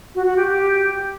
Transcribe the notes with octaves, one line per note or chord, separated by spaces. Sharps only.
F#4
F#4
G4
G4